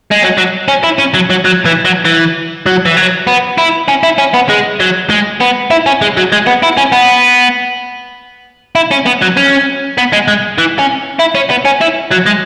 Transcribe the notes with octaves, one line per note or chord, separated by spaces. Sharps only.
G#3
F#3
F#3
C#4
E4
C#4
F#3
F#3
F#3
E3
F#3
E3
F#3
E3
F#3
B3
E4
C#4
E4
C#4
B3
G#3
F#3
G#3
B3
E4
C#4
G#3
F#3
G#3
B3
E4
C#4
B3
E4
C#4
B3
F#3
C#4
B3
G#3
G#3
E3
C#4
E4
C#4
B3
C#4
E4
F#3
G#3